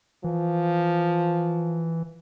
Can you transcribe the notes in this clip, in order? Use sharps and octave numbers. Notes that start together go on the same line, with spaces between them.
E3 F3